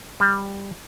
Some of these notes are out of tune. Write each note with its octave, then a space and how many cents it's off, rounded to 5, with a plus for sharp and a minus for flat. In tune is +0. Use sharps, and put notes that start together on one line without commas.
G3 +15